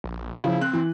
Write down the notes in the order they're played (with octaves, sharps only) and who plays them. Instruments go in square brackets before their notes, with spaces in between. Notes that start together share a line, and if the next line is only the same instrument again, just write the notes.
[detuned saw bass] A#1
[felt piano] C#3 F3 [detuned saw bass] E4
[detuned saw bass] C4 [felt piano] F#6
[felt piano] E3